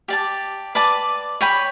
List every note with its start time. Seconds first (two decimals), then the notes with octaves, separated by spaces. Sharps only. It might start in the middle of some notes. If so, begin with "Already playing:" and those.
0.08 G4 D5 A5
0.75 B4 D5 A5 D6
1.41 C#5 G5 B5